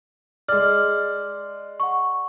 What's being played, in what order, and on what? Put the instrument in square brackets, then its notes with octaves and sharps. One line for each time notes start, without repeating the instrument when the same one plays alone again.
[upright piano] G#3 D5 [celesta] F6
[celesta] F#5 C#6